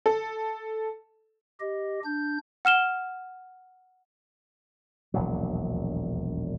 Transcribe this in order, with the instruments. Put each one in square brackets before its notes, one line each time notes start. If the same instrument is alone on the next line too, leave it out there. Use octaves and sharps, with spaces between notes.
[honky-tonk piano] A4
[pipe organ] G4 D#5
D4 G6
[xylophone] F#5 F6 E7 G7
[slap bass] E1 A#1 D#2 F#3